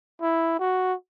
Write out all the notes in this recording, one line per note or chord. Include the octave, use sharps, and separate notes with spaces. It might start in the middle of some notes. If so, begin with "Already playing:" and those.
E4
F#4